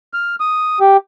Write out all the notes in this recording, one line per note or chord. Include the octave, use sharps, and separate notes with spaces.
F6
D#6
G4